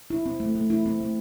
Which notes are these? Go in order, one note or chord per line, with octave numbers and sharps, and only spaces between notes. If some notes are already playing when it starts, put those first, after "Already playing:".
E4
C4
A3
A3
E4
C4
A3